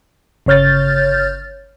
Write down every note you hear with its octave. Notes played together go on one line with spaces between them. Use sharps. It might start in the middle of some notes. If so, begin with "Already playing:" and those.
G1 C#3 C#5 F6 G6 A6